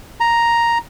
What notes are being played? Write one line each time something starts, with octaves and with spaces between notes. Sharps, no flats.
A#5